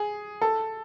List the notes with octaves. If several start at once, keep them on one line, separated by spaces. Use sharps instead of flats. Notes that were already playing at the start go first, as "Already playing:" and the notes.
Already playing: G#4
A4